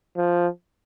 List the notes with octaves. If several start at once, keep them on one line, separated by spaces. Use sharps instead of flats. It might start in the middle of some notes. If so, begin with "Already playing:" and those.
F3